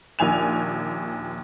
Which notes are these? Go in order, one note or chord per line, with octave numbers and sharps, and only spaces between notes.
A#1 D#2 G#5 F7